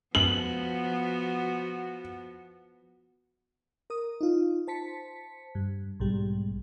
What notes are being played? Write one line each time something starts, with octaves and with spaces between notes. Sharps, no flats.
F3 B3 F#4 F#7
A#4 D#6
D#4 F4
C5 A5 B6 C#7
G2
B1 G#2 G3